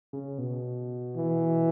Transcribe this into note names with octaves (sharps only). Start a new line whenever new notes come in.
C#3
B2
E3